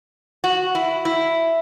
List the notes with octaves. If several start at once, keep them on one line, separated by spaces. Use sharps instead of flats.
F#4
E4
E4